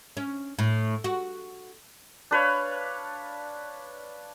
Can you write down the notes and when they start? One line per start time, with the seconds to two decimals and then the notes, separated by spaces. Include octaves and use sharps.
0.17 C#4
0.59 A2
1.04 F#4
2.31 D4 B4 C#5 F5